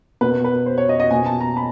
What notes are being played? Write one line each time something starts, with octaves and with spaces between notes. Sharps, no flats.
B2 B4
B4
C5
C#5
D#5
D#5
B2 G#5
A5
A#5
B5